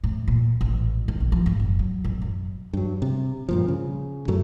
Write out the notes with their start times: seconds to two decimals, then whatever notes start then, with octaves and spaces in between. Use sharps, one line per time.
0.04 A2
0.28 A#2
0.61 A1
1.08 D#3
1.20 A#1
1.32 F3
1.46 G#2
1.60 F#1
1.79 F#3
2.04 A1
2.22 F#2
2.73 G2 F#3
3.02 C3
3.49 G2 A#2 F3
3.68 C#3
4.28 F#2 A2 F#3 A3